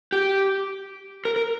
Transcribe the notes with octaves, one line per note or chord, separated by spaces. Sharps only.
G4
A#4
A#4